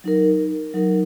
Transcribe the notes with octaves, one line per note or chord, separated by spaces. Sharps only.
F#3 D#4 A#4
F#3 D#4 A#4